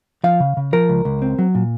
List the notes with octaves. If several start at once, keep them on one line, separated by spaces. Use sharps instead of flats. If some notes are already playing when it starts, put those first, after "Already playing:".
F3 F5
C#3
C#3
F3 A#4
C#2
C#2
C4
F#3
A#2